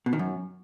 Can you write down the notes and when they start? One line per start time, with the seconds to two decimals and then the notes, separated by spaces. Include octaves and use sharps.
0.06 B2
0.13 D#3
0.19 F#2